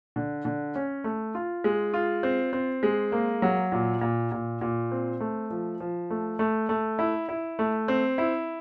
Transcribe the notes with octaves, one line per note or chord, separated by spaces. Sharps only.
D3
D3
C#4
A3
F4
G#3
F4
C4
C4
G#3
A#3
F#3
A#2
A#2
A#2
A#2
C4
A3
F3
F3
A3
A3
A3
E4
E4
A3
C4
E4